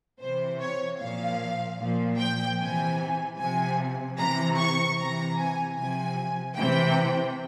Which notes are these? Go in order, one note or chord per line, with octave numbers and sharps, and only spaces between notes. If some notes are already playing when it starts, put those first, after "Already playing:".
C3 E3 C5
C#5
A#2 F3 F5
A#2 F3
G5
C3 E3 G#5
C3 F3 G#5
C3 E3 A#5
C#6
C3 E3 A#5
G#5
C3 F3 G#5
C3 E3 G5